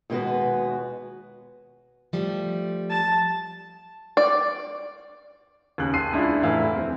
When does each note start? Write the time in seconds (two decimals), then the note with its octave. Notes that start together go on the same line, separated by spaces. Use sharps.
0.10 D#2 B2 G#3 B3 F#4 B4
2.13 F3 G3 A3
2.90 A5
4.17 D5
5.78 D#2 C#3 F#6
5.94 A5 C6 E6 C7 D#7
6.13 C#2 D4 E4 F4 G#4
6.42 F1 A2 E3 E4 F5
6.75 D#1 C4